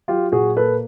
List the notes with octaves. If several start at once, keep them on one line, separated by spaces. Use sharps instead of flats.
F#3 F4 G4
A#2 F#4 G#4
A#3 A4 B4